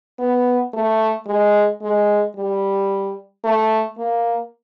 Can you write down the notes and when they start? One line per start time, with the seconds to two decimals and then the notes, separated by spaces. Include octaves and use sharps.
0.19 B3
0.73 A3
1.27 G#3
1.82 G#3
2.36 G3
3.44 A3
3.98 A#3